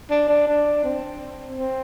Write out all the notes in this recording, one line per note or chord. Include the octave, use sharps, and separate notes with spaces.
D4
D4
D4
C4
C4